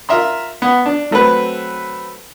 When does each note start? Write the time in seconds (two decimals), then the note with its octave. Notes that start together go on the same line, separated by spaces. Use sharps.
0.09 F4 A#4 E5 A#5 C6
0.62 B3
0.86 D4
1.11 F#3 A3 C4 B4